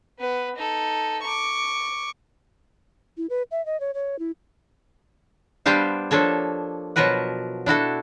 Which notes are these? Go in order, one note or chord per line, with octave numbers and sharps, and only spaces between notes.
B3 B4
D#4 A4
C#6 D6
E4
B4
E5
D#5
C#5
C#5
E4
G3 B3 D4 G4 C5 F5
F3 A#3 D4 A4 C#5
B2 F3 F#3 A#4 B4 F#5
D4 E4 F#4 A4